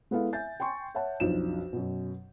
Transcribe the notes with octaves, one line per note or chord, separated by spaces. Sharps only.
G#3 B3 E4 A4 F5
E5 G#5 G6 A6
G5 G#5 C6 C#6
C#5 E5 F#5 A5
B1 F2 D4 E7
F#2 B2